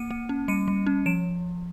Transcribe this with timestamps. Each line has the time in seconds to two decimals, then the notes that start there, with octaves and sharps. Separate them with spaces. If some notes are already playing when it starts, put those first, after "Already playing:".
Already playing: A#3 C#7 D#7
0.11 A#3
0.29 C#4
0.48 G3 C#7 D#7
0.68 G3
0.87 C#4
1.06 F3 D7 E7